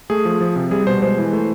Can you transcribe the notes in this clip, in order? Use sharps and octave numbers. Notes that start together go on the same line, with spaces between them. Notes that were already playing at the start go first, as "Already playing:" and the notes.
A3 G#4
F3
F3
C3
G3 G#4
B2 C5
G#3 C5
E3
A3